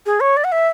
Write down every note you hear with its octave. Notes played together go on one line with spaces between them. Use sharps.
G#4
C#5
D5
F#5
E5